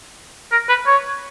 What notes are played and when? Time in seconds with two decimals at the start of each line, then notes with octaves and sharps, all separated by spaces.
0.52 A#4
0.69 B4
0.87 C#5